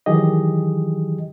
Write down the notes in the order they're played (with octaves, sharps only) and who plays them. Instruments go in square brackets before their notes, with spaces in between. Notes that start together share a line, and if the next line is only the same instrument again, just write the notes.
[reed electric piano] D#3 E3 F#3 G4 G#4 D#5